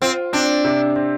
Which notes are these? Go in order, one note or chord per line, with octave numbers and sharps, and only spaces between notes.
C4 F4
C4 D4
C3
C4